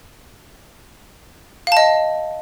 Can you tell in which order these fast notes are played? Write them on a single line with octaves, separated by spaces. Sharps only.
F5 A5 D#5